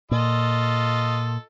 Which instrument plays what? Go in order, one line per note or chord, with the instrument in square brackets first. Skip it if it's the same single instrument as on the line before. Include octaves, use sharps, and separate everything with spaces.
[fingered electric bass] A#2 [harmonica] F4 A4 D#5